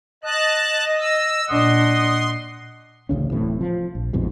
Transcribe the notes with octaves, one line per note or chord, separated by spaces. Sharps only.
D#5 A5 F#6
E6
A#2 D4 D#5 F#5 C6 D#6
A1 D2 C#3 C#4
D1 A2 C3 E3
F3
A#1
A#1 F2 G#2 B2